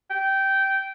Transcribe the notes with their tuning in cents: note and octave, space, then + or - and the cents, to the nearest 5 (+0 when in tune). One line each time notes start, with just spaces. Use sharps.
G5 -15